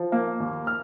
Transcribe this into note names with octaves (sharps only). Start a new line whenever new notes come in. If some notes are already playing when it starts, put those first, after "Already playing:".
Already playing: F3
A#3
D#2
F6